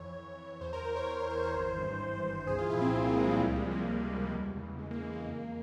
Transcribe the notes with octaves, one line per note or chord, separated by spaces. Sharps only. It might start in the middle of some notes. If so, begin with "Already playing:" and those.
Already playing: F2 E3 C#5
F2
E3
E2 C5
A#4
E3 C5
C#5
E2 A#4
A#4
E3 C5
C5
G#1
G2 E3
G#1
G2 E3
C2 G#4
F4
A#2 F3 E4
C4
C2 C4
A#3
A#2 F3 G#3
G3
C#2 G3
G#3
C3 F3
A#3
C#2
C3 F3
E2
C#3 E3
E2 G#3
A#3
C#3 E3 G#3
A#3
F2